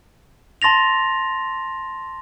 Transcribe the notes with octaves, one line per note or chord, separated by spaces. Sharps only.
A5 C6 A6 A#6 F7